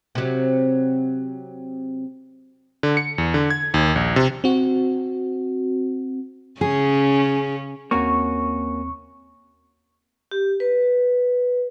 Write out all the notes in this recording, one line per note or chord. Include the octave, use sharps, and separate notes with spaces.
C3 F#3
D3
C#7
E2
D3
G#6
D#2
A#1
C3
C4 F#4
C#3 C#4 G#4
D#2 A#3 C4 C#4 F#4 C#6
G4
B4